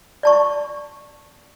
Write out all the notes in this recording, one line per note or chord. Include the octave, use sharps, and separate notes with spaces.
D5 A5 C#6